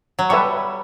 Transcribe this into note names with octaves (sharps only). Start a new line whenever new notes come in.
F#3
G3 B4 E5 A5 C#6